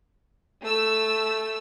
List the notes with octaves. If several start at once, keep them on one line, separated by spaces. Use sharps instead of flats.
A3 E6